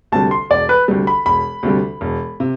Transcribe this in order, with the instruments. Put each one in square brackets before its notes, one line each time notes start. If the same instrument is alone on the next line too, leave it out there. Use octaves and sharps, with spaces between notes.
[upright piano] D2 C3 G3 [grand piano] A5
[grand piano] C6
[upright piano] E1 [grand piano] D5
[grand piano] B4
[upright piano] D2 C3 G3
[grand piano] B5
[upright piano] E1 [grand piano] B5
[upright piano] D2 C3 G3
E1
C3